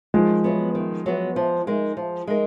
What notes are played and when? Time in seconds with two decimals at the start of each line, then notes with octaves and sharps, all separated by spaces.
0.14 D#3 F3 G#3
0.44 F#3 B3
0.75 D#3
1.06 F#3 B3
1.36 F3
1.67 G#3 D#4 A#4
1.97 F3
2.27 G#3 D#4 A#4